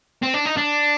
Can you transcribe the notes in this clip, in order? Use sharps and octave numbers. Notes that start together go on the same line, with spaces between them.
C4
D4
D#4
D4